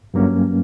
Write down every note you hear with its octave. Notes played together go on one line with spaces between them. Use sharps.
G2 F#3 A#3 C#4